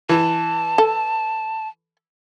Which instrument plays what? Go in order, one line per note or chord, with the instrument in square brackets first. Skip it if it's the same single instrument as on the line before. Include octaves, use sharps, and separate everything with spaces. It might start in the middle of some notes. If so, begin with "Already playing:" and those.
[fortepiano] E3 [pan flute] A5
[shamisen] A4